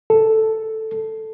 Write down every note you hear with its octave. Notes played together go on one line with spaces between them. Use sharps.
A4